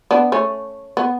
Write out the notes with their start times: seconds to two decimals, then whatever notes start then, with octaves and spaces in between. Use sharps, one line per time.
0.11 B3 D4
0.32 A3 C#4
0.97 B3